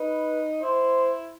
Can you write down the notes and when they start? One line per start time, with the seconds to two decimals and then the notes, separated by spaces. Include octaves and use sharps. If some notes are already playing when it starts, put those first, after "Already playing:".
Already playing: D#4 B4
0.63 E4 C5